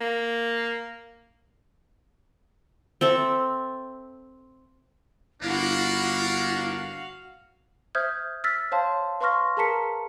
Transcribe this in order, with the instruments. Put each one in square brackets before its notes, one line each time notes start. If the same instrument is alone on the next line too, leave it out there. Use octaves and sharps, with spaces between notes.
[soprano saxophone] A#3
[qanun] C4 A4 E5
[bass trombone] G1 [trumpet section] A#3 D4 [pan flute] E4 [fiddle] F#4 F5
[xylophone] C5 E5 D#6 F6 G6 G#6
E6 F6 A6 B6
C5 C#5 F5 A5 C6
B4 F5 C6 C#6 F6 A#6
G#4 A#4 A5 A#5 B6 C#7